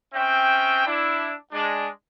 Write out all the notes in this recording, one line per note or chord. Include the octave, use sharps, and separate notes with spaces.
C4 C#4 E5 G5
D4 E4
G#3 D4